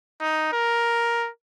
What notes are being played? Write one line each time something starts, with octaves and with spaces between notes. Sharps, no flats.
D#4
A#4